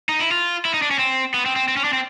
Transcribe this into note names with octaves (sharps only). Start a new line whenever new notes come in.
D#4
E4
F4
E4
D#4
D4
C#4
C4
B3
C4
C4
C4
C#4
D4
C4